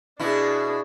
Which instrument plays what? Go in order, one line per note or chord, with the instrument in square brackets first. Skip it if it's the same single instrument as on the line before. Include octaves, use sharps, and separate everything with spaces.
[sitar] B2 E4 [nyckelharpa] D4 G#4